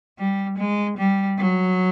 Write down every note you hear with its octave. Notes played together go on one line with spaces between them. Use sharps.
G3
G#3
G3
F#3